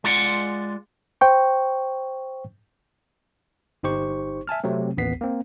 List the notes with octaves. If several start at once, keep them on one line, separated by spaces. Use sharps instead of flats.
G#3 F4 D5 F#5
C5 G5 C#6
G1 D#4 G4 C5 C#6
E5 G#5 A5 F6
C3 F#3 A3 C4
A1 D#2 B3 B6 C7
A#3 C4